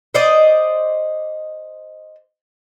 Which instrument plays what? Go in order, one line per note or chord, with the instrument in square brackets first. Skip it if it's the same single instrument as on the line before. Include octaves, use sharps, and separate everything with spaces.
[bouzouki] C5 D5 D#5